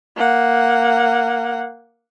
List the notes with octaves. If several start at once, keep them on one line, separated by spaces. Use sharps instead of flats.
A#3 F#5